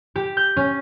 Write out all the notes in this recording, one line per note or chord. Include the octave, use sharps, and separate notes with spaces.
G4
G6
C#4